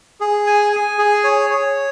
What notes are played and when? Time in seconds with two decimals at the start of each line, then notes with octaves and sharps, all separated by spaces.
0.21 G#4
0.47 G#5
0.73 G#5
0.98 G#4
1.24 C#5
1.50 C#5